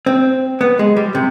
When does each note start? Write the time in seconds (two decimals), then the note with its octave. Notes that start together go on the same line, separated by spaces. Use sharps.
0.06 C4
0.61 B3
0.79 G#3
0.97 G3
1.15 C3